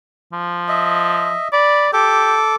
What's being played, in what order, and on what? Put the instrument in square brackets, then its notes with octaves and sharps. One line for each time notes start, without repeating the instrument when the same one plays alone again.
[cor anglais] F3
[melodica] D#5 E5
[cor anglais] D5 [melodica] B5
[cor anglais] G4 [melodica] A4 D6